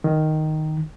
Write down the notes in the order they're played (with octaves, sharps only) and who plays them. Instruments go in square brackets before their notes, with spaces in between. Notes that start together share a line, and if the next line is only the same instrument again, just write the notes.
[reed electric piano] D#3